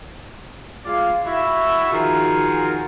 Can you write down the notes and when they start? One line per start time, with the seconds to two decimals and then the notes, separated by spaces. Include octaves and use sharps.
0.85 G#3 F4 D5 F5
1.26 E4 F#4 E5
1.91 D#3 F3 F4 F#4 G#4 A#4